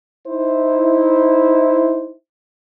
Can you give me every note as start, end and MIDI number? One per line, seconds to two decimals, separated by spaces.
0.28 2.14 63
0.28 2.14 64
0.28 2.14 72